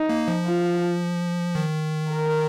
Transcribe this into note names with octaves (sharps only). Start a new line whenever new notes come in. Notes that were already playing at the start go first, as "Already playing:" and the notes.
Already playing: D#4
A#3
F3
F4
D#3
A#4